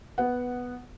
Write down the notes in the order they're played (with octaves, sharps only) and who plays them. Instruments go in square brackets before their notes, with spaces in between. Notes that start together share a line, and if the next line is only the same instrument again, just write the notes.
[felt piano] B3 F#5